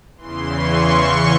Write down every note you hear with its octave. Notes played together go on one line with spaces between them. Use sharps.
E2 C#3 E3 C6
C#6